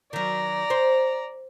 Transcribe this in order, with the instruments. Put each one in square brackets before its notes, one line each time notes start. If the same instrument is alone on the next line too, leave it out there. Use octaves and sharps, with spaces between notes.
[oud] D#3 F#3 [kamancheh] D5 A#5
[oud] C5